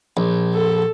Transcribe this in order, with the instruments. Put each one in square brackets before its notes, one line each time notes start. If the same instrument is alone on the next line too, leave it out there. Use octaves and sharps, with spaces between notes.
[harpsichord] A#1
[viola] A4